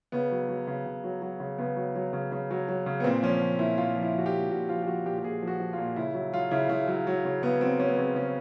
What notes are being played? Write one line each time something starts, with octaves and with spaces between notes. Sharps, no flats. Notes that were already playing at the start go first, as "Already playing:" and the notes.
C#3 B3
F#3
F#3
C#3
C#3
F#3
F#3
C#3
C#3 B3
F#3
F#3
C#3
C#3
F#3
F#3
C#3
B3
A#2 C4
F3 C#4
F3
A#2 E4
A#2 F4
F3
E4
F3 F#4
G4
A#2
A#2 F#4
F3 F4
G4
F3 F#4
A#2 G4
G4
A#2 G#4
F3 F#4
F3
A#2 F4
C#3 E4
F#3 E4
F#3 F4
C#3 E4
C#3 E4
F#3
F#3
C#3
C#3 B3
F#3 C4
F#3 C#4
B3
C#3 C4
C#3 C#4